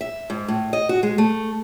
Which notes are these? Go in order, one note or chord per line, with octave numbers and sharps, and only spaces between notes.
E5
G#2
A2
D#5
F#4
G#3
A3